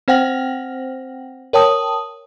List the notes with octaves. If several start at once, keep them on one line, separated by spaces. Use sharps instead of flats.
C4 C5 F#5 G5 A#6 F#7
A#4 C#5 G5 A5 D#6